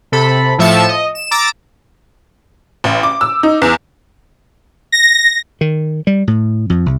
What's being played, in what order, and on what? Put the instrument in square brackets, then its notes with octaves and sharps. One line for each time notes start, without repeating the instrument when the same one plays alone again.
[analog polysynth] C3 A4 B5
A2 F3 E5 A5 C#7 E7
D#5
E7
A#5 D6 E6 A6
[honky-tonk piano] A1
D6
E6
D#4
E2
[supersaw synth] A#6
[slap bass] D#3
G3
A2
F2
C2